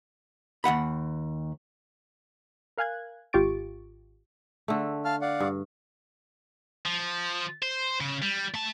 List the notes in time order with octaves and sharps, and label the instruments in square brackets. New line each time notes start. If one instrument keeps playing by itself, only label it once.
[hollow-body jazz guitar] D#2 A3 F#5 B5
[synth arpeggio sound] A#4 F5 G#5 F#6 G#6
G#1 F4 G4 C#6 A6 D7
[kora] D3 A3
[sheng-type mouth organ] F5 A5 F6
D5 F5 F#5
[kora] G2
[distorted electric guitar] F3
C5
C#3
G3
A3 A5